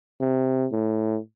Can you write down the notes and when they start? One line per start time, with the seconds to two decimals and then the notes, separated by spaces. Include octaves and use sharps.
0.20 C3
0.72 A2